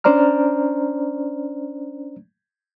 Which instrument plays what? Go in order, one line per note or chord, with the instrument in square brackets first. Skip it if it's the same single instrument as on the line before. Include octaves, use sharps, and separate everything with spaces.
[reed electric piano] C#4 D4 C5 D5 A#5 F6